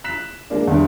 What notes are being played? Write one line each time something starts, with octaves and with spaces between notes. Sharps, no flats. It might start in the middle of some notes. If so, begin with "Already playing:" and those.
F#6 B6 E7
G#3 A#3 D4
E2 D3 G3